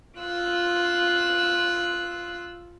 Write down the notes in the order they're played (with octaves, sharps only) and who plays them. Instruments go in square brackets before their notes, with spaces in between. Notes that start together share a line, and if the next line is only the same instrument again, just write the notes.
[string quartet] F4 E6 F#6